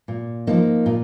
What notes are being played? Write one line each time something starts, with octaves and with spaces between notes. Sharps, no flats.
A#2
F3 A#3 D#4
A#2